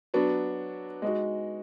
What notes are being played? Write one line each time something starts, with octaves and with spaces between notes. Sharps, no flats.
F#3 B3 D4 F#4
G#3 D#4 F#4